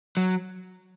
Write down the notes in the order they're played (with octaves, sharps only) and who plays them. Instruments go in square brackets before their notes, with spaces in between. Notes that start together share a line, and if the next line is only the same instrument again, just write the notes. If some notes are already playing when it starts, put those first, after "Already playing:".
[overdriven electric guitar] F#3